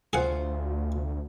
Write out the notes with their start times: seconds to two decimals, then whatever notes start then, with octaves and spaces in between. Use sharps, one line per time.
0.13 D2 F4 G#4 C5 F#5